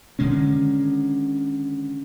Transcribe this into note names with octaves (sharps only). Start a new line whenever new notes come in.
D3 D#3 G#3 C#4